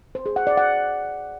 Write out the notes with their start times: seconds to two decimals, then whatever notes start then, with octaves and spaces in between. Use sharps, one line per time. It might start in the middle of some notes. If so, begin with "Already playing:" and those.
0.15 C5
0.26 G#4
0.36 F#5
0.47 D5
0.57 F#5